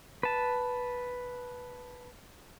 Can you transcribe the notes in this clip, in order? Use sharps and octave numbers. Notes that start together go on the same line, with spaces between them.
B4 A5